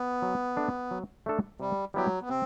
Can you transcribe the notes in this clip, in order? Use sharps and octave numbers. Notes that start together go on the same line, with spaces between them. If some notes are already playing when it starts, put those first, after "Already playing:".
Already playing: B3
F#3
A3 D4 A4
F#3
A3 D4 A4
C3 G3
F#3 G3 B3 E4 G4
B3
C3 C4